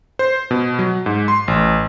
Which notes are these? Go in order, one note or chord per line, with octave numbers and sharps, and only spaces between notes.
C5
B2
F#3
G#2
C6
A1